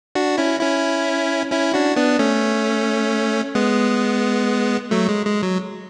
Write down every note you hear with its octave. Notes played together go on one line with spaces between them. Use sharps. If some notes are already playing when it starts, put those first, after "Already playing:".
D4 F#4
C#4 E4
C#4 E4
C#4 E4
D4 F#4
B3 D4
A3 C#4
G#3 B3
F#3 A3
G#3
G#3
F#3